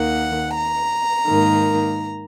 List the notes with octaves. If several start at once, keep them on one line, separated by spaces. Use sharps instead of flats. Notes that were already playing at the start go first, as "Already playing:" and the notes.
Already playing: D#2 D#3 A#3 F#5
A#5
G#2 D#3 A#3